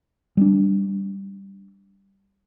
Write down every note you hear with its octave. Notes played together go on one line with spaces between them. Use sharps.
G3 A#3 D4